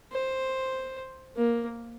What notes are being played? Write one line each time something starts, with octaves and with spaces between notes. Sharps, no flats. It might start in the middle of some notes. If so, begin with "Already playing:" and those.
C5
A#3